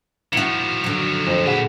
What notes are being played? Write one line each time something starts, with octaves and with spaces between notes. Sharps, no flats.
D#3 F3 E4 F#4
D3 F#3
F2
A#2 G#4 B4 F#5 E7